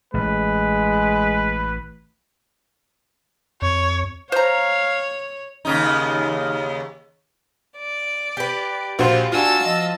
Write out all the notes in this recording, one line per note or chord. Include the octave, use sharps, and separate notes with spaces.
A1 G#3 B4
F2 C#5
C5 C#5 F5 A#5
D#2 C#3 D#4
D5
G4 B4
A#1 F4 F#4 C5
D4 F4 F#4 G#5 A5 E6
F3 D#5